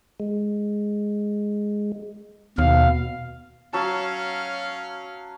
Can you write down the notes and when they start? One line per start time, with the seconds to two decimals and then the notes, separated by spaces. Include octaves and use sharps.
0.20 G#3
2.58 D#2 B2 F5
3.73 F#3 C#4 F5 A5